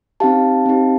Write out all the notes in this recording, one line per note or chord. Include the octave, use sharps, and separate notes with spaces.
C4 D#4 G4 F5 A5
C4 D#4 G4